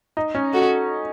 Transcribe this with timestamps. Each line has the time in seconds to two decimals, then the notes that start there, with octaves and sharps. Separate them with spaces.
0.17 D#4
0.35 C#4
0.53 F#4 A4